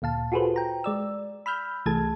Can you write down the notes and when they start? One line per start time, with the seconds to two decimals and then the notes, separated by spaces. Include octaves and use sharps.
0.02 D2 A#2 F5 A5
0.32 F4 F#4 G#4 A4 B4 C5
0.56 G5 A#5
0.84 G#3 D5 E6
1.46 B5 E6 F6 G6
1.86 C2 E3 A3 G#4 A5 G#6